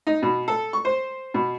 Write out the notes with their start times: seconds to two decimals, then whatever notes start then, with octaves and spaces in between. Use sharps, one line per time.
0.07 D#4
0.22 B2
0.48 A4
0.73 C#6
0.85 C5
1.34 B2